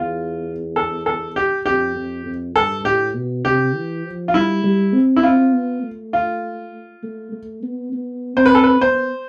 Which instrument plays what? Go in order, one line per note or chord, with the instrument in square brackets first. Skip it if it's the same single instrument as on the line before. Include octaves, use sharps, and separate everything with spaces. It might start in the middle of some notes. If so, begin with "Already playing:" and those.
Already playing: [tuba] E2 [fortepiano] F4
[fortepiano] A4
A4
G4
[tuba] F2 [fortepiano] G4
[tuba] F2
F2
[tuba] G2 [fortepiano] A4
[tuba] A2 [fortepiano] G4
[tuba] B2
[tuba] C3 [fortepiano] G4
[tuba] E3
F3
[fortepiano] F4
[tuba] G3 [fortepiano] E4
[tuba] G3
C4
[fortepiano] E4
[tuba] C4 [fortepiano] F4
[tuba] B3
A3
[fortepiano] F4
[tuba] A3
A3
B3
B3
[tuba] C4 [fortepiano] C5
[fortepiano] B4
A4
B4
[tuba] B3 [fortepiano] C5